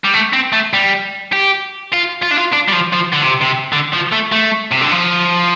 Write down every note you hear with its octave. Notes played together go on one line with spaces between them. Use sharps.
G3
A3
C4
A3
G3
G4
F4
F4
D4
F4
D4
G3
F3
F3
D3
C3
C3
D3
F3
A3
A3
C3
D3
F3